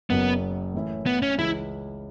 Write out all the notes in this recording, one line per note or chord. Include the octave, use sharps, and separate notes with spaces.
F#1 F#2 F#3 B3 C#4
A2 E3 C#4 E4
B3
C#4
C#2 C#3 E3 E4